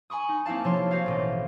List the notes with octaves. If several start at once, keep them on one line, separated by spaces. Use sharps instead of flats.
G#5 B5 C#6 D#6
D#4
A#3 C4 E4 F5 A5
C3 F3 C#5 C6
F#4 C5 C#5 F5
A1 B2 D#5